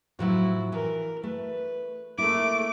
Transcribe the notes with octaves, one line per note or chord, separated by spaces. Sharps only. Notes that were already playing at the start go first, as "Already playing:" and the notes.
A2 F3 F#3 E4 F#4
E3 A#4
A3 B4
A3 A#3 E4 D6